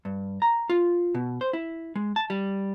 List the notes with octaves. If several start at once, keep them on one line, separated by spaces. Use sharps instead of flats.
G2
A#5
F4
B2
C5
E4
G#3
A5
G3